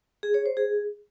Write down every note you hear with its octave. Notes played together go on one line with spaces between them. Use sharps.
G#4
C#5
C5
G#4